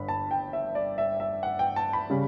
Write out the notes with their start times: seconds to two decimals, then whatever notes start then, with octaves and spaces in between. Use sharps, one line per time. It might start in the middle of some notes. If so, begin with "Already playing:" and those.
Already playing: G1 G2 D3 B5
0.08 A5
0.31 G5
0.53 E5
0.75 D5
0.98 E5
1.20 E5
1.43 F#5
1.59 G5
1.76 A5
1.93 B5
2.10 C#3 G3